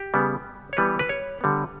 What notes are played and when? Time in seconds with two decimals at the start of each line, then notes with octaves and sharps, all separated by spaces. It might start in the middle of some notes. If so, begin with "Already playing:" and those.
Already playing: G4
0.14 C#3 G3 B3
0.73 C#5
0.77 E3 G3 B3 B4
0.99 B4
1.09 C#5
1.41 D3 G3 B3